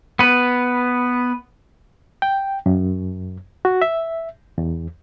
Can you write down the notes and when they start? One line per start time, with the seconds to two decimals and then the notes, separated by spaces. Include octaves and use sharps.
0.19 B3 B4
2.22 G5
2.66 F#2
3.65 F#4
3.82 E5
4.58 E2